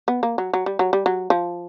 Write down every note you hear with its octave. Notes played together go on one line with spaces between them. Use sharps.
B3
A#3
F#3
F#3
G3
F#3
G3
F#3
F3